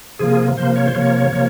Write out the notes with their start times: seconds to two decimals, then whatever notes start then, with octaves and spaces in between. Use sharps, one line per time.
0.19 C3 F3 A#3 G#4
0.57 C3 F3 A#3 C5
0.76 C#5
0.86 C5
0.95 C3 F3 A#3 C#5
1.32 C3 F3 A#3